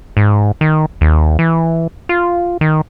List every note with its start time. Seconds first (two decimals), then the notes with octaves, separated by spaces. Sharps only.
0.17 G#2
0.61 D#3
1.01 D#2
1.39 E3
2.09 F4
2.61 D#3